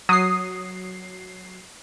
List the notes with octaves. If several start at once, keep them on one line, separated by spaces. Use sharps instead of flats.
F#3 D#6 C7